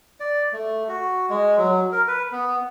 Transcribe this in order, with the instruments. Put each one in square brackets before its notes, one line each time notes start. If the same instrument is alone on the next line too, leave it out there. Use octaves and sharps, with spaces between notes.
[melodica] D5
A3
F#4
G#3
F#3
A#4
B4
B3